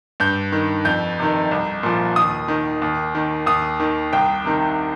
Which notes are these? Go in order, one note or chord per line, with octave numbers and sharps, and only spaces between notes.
G2 G6
D#3
F2 G6
C3 D#3
C2
A#2 F3
D#2 D#6
D#3
D#2
D#3
D#2 D#6
D#3
C2 G5
C3 D#3